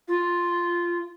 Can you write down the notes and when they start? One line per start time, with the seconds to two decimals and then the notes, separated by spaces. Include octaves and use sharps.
0.08 F4